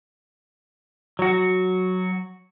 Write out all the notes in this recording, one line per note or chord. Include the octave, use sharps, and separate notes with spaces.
F#3 F#4